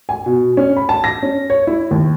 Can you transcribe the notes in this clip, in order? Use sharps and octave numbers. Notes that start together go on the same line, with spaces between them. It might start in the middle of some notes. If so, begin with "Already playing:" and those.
G#5
B2
C#4
B5
A5
A#6
C#4
C#5
E4
D#2